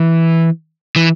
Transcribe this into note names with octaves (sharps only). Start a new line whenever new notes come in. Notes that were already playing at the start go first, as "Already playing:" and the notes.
Already playing: E3
E3